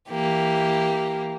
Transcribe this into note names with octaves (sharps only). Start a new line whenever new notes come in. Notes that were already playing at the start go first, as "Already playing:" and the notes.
E3 A#3 G4